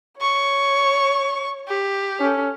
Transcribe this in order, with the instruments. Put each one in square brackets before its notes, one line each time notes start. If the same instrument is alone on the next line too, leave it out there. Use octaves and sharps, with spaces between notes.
[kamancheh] C#5 [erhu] C#6
[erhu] G4
[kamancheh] C#4 A4